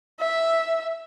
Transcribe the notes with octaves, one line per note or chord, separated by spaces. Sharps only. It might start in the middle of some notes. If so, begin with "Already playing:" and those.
E5